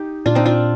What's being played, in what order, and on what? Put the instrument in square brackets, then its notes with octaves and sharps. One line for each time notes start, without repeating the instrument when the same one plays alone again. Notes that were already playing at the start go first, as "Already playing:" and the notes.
Already playing: [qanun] D#4 G4
[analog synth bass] A#2 [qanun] D4 F4
[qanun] C4 D#4
D4 F4